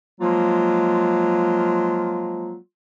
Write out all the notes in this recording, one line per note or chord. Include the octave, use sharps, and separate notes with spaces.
F3 F#3 G#3 A#3 F4